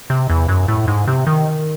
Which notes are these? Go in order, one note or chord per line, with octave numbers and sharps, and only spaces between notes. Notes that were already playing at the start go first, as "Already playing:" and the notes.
C3
E2
F#2
A2
G#2
C3
D#3